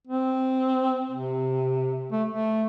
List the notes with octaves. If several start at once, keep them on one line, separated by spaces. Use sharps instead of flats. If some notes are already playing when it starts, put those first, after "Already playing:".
C4
C3
A3
A3